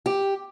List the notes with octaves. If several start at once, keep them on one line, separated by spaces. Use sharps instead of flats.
G4